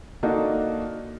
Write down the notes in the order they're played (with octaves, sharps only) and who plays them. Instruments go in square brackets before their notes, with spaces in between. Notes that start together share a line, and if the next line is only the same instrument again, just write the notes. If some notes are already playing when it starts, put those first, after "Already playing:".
[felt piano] A#3 D4 D#4 F#4 A4